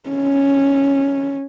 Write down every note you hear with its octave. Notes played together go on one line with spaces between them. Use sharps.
C#4